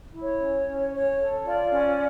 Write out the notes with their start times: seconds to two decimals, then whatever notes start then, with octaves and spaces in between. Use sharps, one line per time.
0.12 E4
0.22 C#5
0.39 C#4
0.66 C#4
0.92 C#5
1.18 A4
1.44 F4 D5
1.71 C#4